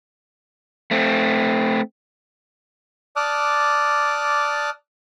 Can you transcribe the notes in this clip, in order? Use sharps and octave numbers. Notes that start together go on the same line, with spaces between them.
A3 C4
D5 A5 D6 D#6 F6 F#6